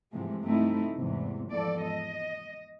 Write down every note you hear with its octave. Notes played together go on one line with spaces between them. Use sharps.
G#2 C3 E3 F3 G#3 A3
G2 A3 C4 D#4 E4
E2 G#2 C3
E2 G#2 F3 A4 D5
D#5